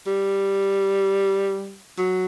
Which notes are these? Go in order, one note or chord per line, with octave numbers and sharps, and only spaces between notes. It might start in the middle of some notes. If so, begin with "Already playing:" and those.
G3
F#3